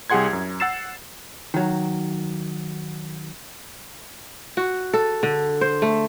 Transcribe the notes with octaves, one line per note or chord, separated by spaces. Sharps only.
C2 G4 G#4 F#5 C6 G#6
F#2
F#5 E6 A6 C7 E7
D#3 F#3
F#4
A4
D3
C5
A3